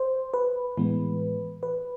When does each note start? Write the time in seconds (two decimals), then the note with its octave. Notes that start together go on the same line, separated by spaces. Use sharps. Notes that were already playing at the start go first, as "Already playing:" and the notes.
Already playing: C5
0.34 B4
0.77 A2 E3 G#3 B3
1.63 B4